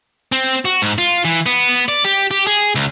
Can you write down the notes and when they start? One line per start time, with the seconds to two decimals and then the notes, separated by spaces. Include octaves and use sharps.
0.32 C4
0.65 F#4
0.82 G#2
0.98 F4
1.25 E3
1.46 B3
1.88 D5
2.04 G4
2.31 G4
2.47 G#4
2.75 C#2